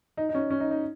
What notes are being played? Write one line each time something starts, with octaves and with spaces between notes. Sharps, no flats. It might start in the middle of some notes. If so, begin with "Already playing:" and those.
D#4
D#4
C#4
C#4
D#4
D#4